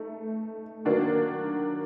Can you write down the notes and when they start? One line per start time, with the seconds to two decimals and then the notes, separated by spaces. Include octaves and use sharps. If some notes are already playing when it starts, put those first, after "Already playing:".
Already playing: A3 D#4
0.85 D#3 F#3 A#3 D4 F#4